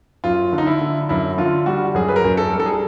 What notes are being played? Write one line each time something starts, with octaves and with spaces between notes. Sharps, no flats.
F#2 F4
D3
D#4
E4
D3
F#2 E4
D3 F4
G3 F#4
F#2 G#4
B4
A#4
F#2
A4
G3
A4
G#4
A4